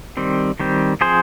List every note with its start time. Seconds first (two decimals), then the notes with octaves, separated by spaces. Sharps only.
0.17 D#3 G3 C4
0.60 D#3 G3 C4
1.01 F3 C4 G#4 C5